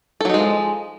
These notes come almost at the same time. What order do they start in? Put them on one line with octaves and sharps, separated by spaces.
A4 F#3 D#4 G#3 F3